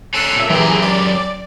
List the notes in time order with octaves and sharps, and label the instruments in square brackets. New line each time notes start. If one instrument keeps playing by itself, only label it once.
[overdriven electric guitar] C#4 A4 [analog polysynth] F#6 C7 D#7
[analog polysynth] A#2 E5
[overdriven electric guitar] F#2 G4 [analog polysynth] E3 G#4
[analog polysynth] D5